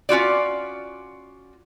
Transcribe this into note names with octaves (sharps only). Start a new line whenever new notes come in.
C#4 F4 F#4 D5